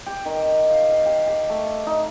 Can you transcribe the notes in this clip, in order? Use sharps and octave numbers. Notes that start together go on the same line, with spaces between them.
G4
D#3
F5
F5
G4
G4
A3
D#4